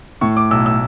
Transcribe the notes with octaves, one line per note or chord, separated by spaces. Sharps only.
A2 C#6
D6
B1 E6
E6